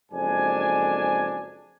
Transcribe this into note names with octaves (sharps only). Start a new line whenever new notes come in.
F#1 F2 G#3 D4 G#5